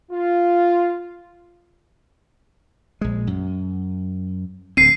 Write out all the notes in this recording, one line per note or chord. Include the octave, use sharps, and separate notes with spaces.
F4
A#1 G#3
F#2
D1 D2 C4 C7 D#7